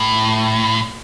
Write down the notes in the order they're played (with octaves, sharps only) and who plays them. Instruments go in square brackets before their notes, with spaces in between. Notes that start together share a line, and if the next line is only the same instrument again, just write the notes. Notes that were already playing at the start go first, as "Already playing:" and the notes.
Already playing: [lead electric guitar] A2